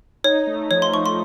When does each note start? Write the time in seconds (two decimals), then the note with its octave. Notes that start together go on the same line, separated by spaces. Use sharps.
0.24 D#4 C#5
0.47 A3
0.71 F3 C#5
0.82 C6
0.94 F3 C#6
1.06 C6